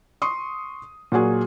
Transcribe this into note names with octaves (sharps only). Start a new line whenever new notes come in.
C6 C#6 D#6
A#2 F#3 F#4 G#4